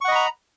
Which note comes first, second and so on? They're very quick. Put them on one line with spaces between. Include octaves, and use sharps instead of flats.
C#6 F#5 D#5 B5 A#5